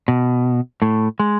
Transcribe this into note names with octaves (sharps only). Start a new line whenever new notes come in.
B2
A2 A3
G#3